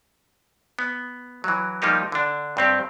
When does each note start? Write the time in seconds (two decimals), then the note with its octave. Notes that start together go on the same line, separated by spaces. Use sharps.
0.79 B3
1.44 E3 F#3
1.82 F3 G3 A#3 D#4 G4
2.12 D3 D4
2.57 G2 C4 G4